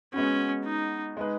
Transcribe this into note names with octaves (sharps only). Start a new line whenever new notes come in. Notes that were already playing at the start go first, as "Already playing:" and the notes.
G#3 B3 C#4 F#4
D#4
G#3 D#4 G#4 B4